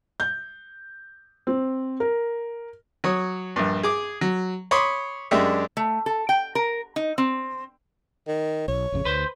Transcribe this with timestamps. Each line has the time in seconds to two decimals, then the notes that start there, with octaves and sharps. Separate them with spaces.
0.20 G6
1.47 C4
2.00 A#4
3.04 F#3 C#5 D#6
3.56 A#1 G2
3.83 G#4 D6
4.21 F#3
4.71 C#5 B5 C6 D6 D#6
5.31 F#2 G#3 D4 G4 E5
5.77 A3
6.06 A4
6.29 G5
6.55 A#4
6.96 D#4
7.18 C4
8.28 D#3
8.68 B1 C#5
8.92 A1 F2 C#3
9.05 D2 B4 C5